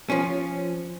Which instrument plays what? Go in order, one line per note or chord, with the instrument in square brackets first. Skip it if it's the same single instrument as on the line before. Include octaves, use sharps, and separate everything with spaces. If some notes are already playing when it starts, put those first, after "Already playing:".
[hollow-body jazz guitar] F3 C#4